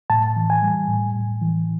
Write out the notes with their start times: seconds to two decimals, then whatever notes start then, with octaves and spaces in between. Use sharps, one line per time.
0.10 A2 A5
0.36 E3
0.50 G#5
0.62 G3
0.88 A2
1.15 A2
1.41 E3